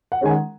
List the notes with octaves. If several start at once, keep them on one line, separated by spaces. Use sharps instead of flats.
F#5
D#3 G#3 C#4 G#5
F#5